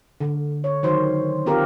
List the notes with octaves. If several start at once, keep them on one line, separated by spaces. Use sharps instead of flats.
D3
C#5
D#3 F#3 C5
C4 F4 G4 A#4